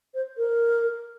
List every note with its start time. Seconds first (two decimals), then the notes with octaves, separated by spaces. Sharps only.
0.14 C5
0.37 A#4